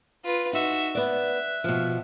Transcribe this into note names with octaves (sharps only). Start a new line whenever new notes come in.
F4 B4
D#4 F#4 E5
B3 D5 E5 F#6
B2 F3